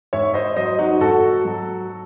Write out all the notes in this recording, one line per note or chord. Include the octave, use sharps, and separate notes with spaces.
G#2 C#5 E5
C5 D#5
F#3 C5 D#5
D#4 F#4
G#2 F#4 A4
F#3